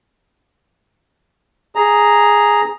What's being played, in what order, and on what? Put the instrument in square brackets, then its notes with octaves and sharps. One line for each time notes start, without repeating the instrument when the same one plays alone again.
[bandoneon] G#4 A#5